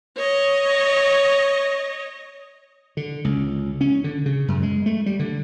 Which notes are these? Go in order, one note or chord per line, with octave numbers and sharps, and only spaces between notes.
C#5 D#5
D3
C#2
C#4
D3
C#3
F#2
G#3
A3
G3
D3